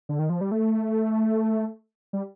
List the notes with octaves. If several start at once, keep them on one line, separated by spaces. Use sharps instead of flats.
D3
D#3
F3
G3
A3
G3